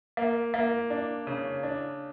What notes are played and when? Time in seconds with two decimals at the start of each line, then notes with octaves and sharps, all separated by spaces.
0.17 A#3
0.54 A#3
0.90 D4
1.27 C#3
1.63 D4